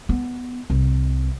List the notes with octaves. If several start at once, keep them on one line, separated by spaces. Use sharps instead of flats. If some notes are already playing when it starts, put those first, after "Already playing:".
B3
C2